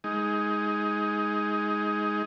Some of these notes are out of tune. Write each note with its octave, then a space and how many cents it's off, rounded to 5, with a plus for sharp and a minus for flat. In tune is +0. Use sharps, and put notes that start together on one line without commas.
G#3 +0 D#4 +20